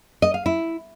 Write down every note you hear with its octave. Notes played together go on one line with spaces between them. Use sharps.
D#5
F5
E4